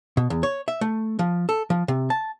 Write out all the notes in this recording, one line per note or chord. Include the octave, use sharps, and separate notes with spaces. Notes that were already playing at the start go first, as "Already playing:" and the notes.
B2
E2
C#5
E5
A3
F3
A4
F3
C3
A5